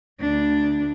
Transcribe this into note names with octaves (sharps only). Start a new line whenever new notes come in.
D2 D4